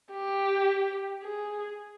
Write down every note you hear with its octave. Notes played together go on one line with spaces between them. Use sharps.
G4
G#4